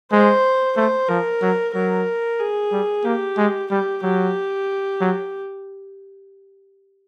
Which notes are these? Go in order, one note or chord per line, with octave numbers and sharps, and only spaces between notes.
G#3 C5
A3 C5
F3 A#4
F#3
F#3 A#4
G#4
G3
A#3 G4
G#3
G3 G4
F#3 G4
F#3